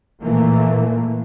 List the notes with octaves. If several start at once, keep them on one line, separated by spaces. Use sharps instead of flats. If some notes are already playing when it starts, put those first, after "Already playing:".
A#2 E3 A3 A#3